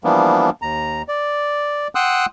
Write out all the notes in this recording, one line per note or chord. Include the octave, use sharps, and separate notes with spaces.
E3 F3 G3 A#3 B3 D4
D#2 A#5
D5
F#5 G5 C6 D#6 E6 F#6